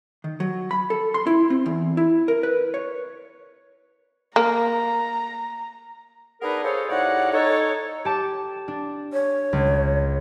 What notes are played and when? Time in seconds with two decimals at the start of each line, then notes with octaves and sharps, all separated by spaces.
0.24 D#3
0.40 F#3
0.71 B5
0.90 A4
1.14 C6
1.27 E4
1.50 C4
1.66 E2
1.97 E4
2.28 A#4
2.43 B4
2.74 C#5
4.36 A#3 A#5
6.41 B3 D4 D#4 G#4 A#4 B4
6.64 F4 G#4 A4 C5 C#5
6.89 A2 C3 D#4 C#5 D5 F#5
7.32 D#4 A4 C#5
8.05 G4 A5 D6
8.68 D4
9.13 C#5
9.53 C#2